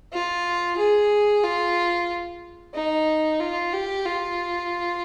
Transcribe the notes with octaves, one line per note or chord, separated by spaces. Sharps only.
F4
G#4
F4
D#4
F4
G4
F4